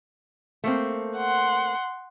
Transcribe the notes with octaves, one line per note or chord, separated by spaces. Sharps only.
A3 A#3 C4
F#5 C6